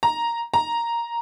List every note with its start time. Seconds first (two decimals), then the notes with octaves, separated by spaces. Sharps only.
0.03 A#5
0.54 A#5